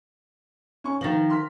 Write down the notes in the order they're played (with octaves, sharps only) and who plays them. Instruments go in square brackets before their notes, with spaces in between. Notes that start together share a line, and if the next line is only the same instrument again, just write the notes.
[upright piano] C#4 C#6
[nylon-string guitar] D#3 F3 [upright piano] A6 A#6 F#7
[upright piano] C6 F6 B6